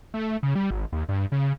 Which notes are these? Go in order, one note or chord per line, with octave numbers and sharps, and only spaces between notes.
A3
C#3
G3
G#1
D#2
G2
C#3